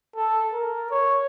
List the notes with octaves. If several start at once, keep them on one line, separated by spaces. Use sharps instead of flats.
A4
A#4
C#5